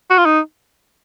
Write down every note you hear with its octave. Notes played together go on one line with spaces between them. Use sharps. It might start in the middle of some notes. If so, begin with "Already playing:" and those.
F#4
F4
D#4